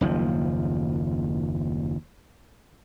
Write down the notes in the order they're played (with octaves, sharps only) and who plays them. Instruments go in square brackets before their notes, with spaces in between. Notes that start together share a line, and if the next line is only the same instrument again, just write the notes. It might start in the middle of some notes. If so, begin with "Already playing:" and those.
[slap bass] F#1 D#2 F3